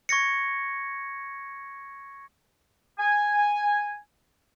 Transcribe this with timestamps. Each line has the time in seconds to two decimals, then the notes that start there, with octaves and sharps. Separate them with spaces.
0.09 C#6 G#6 A#6 C#7
2.99 G#5